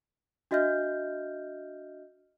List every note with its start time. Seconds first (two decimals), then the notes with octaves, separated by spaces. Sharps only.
0.51 D4 F#4 D#5 E5 F6 G6